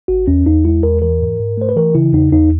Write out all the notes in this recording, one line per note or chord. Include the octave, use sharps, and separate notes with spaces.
G#1 F#4
E2 C#4
E2 D#4
G#3 E4
E2 A#4
E3 A#4
G#2
G#2
A3 C5
B4
E3 A#4
C#3 E4
E2 D#4
E2 D#4